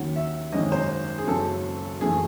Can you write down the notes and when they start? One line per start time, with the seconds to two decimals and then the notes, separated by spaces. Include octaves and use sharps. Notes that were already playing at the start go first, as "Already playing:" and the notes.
Already playing: D#2 D#3 F#3 C#4 F#5
0.16 E5
0.52 G#1 F#2 D#3 G#3 C#4 D#5
0.72 C5
1.18 G#4
1.27 F#1 F#2 C#3 F#3 A4
2.01 F#1 F#2 E3 A3 G#4